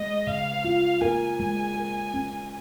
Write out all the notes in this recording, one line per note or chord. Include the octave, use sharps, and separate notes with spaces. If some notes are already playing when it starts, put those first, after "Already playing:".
Already playing: G#3 D#5
C#3 F5
F4
A#4 G#5
G#3
A#4
C#4